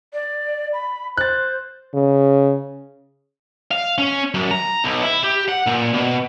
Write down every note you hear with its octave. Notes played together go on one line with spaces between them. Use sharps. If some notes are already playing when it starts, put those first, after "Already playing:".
D5
B5
C5 F#6 A6
C#3
F5
C#4
F#2
A#5
B1
E4
G4
F#5
A#2
B2